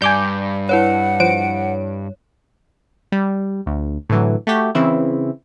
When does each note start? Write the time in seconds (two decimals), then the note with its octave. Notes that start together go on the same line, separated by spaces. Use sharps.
0.02 G2 D5 G#5 D6 G6
0.69 E4 B4 C#5 F#5
1.20 F3 C5 C#5 D7
3.12 G3
3.66 D2
4.09 A2 D3 E3 F#3
4.47 A3 F#4 G4
4.75 C#3 E3 C4 E4